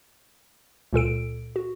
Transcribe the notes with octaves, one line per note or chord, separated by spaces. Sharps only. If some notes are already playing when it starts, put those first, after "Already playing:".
C#2 A#2 A4 D7
F#4